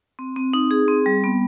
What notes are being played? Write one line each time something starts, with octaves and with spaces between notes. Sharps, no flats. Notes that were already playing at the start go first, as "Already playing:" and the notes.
C4
C4
D#4
G#4
C4
G3
B3